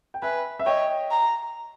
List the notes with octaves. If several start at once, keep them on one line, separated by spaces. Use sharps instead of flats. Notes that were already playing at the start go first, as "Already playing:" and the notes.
G5
B4 E5 G#5
E5
C#5 D#5 G5
A#5